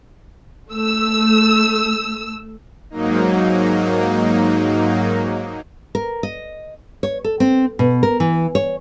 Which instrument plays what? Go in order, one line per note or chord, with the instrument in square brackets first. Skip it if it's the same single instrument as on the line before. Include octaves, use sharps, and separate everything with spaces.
[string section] A3 E6
[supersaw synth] G#2 F#3 A#3 D#4
[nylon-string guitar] A#4
D#5
C#5
A4
C4
B2
A#4
E3
C#5